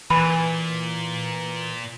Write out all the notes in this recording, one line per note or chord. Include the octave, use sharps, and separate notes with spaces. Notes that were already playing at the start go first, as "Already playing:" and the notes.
A#2 E3 B5